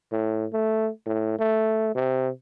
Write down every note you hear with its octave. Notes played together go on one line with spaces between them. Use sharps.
A2
A3
A2
A3
C3